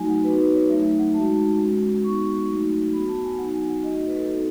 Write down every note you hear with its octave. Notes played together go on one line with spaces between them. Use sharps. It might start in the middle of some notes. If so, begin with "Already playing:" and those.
Already playing: F#3 A3 D#4 F#4 G#5
F#5
B3 D#4 F#4 B4
B4
C#5
F#3 A3 D#4 E5
F#5
G#3 D#4 F#4 A5
G#3 C#4 F#4
G#3 B3 D#4 F#4 C#6
F#3 A3 D#4 F#4
B3 F#4 B5
A5
G#5
F#3 B3 D#4 F#4 F#5
G#5
F#5
A3 D#4 F#4 D#5
B4
A4
B3 D#4 F#4 A4